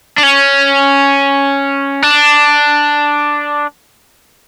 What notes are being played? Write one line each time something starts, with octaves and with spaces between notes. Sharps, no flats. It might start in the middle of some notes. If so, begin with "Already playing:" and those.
D4
C#4
D4